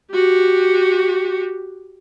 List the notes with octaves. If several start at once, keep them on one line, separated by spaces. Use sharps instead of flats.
F#4 G4